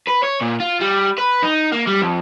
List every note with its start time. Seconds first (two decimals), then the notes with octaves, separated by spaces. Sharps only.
0.08 B4
0.24 C#5
0.42 A#2
0.60 F4
0.81 G3
1.18 B4
1.43 D#4
1.72 A#3
1.87 G3
2.02 F2